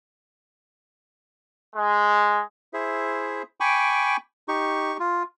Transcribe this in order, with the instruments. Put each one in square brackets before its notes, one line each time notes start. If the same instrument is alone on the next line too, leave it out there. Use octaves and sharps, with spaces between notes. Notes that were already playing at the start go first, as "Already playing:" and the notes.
[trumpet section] G#3
[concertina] E4 G#4 C5 E5
G5 G#5 B5 C#6 D6
D#4 G4 C#6
F4